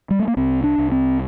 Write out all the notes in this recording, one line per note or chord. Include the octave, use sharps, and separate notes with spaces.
G3
A3
A#3
C2 C4
D4
C2
C4